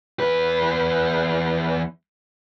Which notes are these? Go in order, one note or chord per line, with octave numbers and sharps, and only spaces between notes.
E2 B4